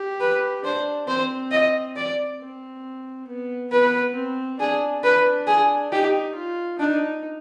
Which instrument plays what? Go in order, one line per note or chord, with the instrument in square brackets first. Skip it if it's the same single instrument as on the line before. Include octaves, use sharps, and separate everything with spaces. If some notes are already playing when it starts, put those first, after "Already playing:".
Already playing: [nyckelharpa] G4
[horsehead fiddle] B4
[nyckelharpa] D4 [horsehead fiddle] C5
[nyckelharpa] C4 [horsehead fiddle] C5
[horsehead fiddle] D#5
D5
[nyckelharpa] C4
B3
[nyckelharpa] B3 [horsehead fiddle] B4
[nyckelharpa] C4
[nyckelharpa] D4 [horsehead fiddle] G#4
[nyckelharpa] D4 [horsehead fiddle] B4
[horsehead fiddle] G#4
[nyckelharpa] D#4 [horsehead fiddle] G4
[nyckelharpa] F4
[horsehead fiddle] D4 [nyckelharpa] D#4